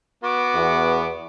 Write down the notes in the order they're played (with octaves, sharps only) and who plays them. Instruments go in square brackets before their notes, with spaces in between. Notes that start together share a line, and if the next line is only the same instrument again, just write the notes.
[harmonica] B3 F#4 [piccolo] D6
[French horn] E2